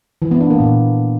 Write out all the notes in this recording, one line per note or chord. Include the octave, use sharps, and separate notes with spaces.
E3
B3
D4
A#3
A#2